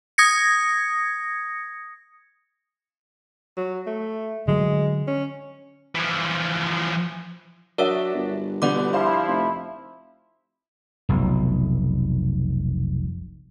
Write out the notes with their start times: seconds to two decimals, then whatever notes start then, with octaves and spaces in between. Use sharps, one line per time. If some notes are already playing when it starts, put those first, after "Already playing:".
0.18 D#6 G#6 A#6 C#7
3.57 F#3
3.87 A3
4.48 D3 F#3 G#3
5.07 C#4
5.95 E3 F3
7.78 F#3 D4 F#4 A#4 C#5 E5 E6
8.15 G1
8.62 B2 D3 B3 G4 D5 D6
8.93 F3 E4 C5 F5 C6
9.27 F1
11.09 F1 B1